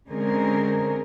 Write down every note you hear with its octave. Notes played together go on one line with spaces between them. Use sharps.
D3 G#3 C4 C#4 G#4 A#4